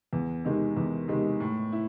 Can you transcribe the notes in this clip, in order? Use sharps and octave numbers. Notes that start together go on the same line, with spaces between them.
E2
C3 D#3 G#3
E2
C3 D#3 G#3
A2
E4